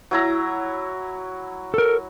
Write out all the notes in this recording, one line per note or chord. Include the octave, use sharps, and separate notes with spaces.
F#3 E4 A#5
A4 A#4